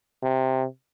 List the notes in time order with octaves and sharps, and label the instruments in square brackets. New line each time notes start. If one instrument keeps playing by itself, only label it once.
[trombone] C3